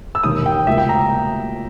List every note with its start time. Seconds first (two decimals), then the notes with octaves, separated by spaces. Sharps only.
0.15 E6
0.23 E1 D#2 D#3 D#6
0.46 G5
0.67 C#2 B2 A#3 E5
0.78 G5
0.89 A#5